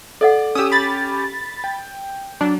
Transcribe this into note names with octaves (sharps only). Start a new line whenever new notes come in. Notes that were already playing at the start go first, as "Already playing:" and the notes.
A4 D5 D#5 F#5
C#4 G4 D#6 E6
B5 A6
G5
F#3 D4